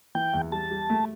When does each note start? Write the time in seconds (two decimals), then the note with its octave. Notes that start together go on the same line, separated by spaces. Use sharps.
0.15 E3 G5
0.34 E2
0.52 G3 A5
0.71 G3
0.89 A3